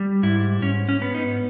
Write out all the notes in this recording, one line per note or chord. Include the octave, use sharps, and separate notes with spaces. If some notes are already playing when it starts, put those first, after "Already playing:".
Already playing: G3
G#2 E4
G#2 C#4
C#4
B3
D#4